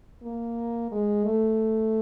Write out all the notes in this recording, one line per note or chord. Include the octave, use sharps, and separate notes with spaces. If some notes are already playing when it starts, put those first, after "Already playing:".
A#3
G#3
A3